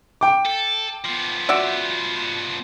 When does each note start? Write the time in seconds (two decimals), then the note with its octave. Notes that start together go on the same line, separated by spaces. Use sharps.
0.21 G5 D6
0.45 A4
1.04 F3 B3
1.49 F#4 D5 E5